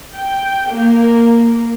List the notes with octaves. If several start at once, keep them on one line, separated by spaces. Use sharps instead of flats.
G5
A#3